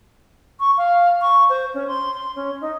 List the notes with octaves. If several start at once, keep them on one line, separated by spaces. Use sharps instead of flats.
C#6
F5
C#6
C5
C#4
C6
C6
C#4
D#4